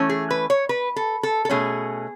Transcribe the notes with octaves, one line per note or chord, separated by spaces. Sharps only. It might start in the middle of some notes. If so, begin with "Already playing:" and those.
Already playing: E3 A3 C#4
G#4
B4
C#5
B4
A4
A4
A4
B2 A3 C#4 G#4